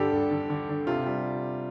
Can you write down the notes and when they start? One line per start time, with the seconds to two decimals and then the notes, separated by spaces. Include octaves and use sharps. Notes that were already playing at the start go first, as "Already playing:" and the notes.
Already playing: G2 D3 G3 G4 A4
0.12 G2
0.31 D3
0.50 D3
0.69 D3
0.87 C3 F4
1.06 G3